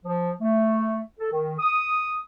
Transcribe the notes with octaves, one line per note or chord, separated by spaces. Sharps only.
F3
A3
A4
D#3
D#6